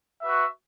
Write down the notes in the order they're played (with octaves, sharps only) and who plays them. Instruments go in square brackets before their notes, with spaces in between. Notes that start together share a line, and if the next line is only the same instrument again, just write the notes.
[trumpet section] F#4 B4 E5